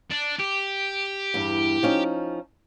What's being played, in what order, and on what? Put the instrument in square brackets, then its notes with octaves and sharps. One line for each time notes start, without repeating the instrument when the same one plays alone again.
[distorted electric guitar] D4
G4
[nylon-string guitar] E2 G2
F3 C#4 D#4